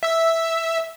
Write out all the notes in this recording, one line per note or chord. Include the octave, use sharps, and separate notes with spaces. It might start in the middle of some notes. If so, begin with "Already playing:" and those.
E5 E6